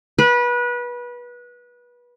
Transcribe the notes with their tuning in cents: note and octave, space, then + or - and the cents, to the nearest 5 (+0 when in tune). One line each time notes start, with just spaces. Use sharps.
B4 -25